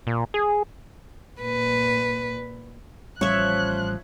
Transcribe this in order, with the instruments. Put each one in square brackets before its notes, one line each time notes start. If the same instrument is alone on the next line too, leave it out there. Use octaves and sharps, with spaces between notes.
[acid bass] A#2
G#4
[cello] A#2 B4
[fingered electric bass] A1 G3 C#4 [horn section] F3 [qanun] C#5 E5 [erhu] F#6